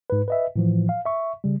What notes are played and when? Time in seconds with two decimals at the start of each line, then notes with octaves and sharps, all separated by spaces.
0.10 G#2 B4
0.28 B4 D#5 E5
0.56 A2 E3 F3
0.89 F5
1.05 E5 C#6
1.44 C#3 G3